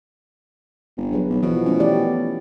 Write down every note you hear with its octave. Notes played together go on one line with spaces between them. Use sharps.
G1
F#3 G#4 B4
B1
B2 E3 F3
A3 C#4
E4 G4 D5